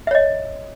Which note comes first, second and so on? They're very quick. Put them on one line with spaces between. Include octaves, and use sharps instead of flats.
E5 C#5 D#5